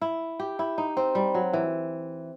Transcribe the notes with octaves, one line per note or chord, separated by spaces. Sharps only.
E4
G4
E4
D#4
C4
G3
F#3
E3